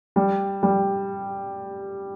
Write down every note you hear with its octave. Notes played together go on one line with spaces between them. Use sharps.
G3
G3